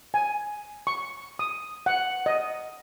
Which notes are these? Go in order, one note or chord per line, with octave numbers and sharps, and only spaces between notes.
G#5
C#6
D#6
F#5
D#5